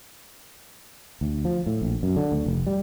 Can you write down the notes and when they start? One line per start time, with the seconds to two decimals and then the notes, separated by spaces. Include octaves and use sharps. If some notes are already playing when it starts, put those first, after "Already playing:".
1.21 D2
1.45 F3
1.66 A2
1.82 A#1
2.03 F#2
2.16 D3
2.32 D2
2.46 F1
2.67 G3